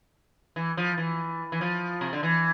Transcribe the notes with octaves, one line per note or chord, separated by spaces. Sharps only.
E3
F3
E3
E3
F3
C3
D3
E3